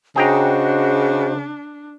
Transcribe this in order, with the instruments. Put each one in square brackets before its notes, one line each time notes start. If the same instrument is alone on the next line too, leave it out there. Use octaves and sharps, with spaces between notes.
[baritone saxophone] C#3 [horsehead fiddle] D4 [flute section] F#4 C5 D#5 [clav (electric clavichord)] G#4 G5 A#5